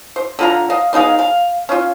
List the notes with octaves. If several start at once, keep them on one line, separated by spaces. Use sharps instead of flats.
C5
D3 F4 A#5
D#5 F5
B3 D#4 G#4 F5
F5
C#4 F4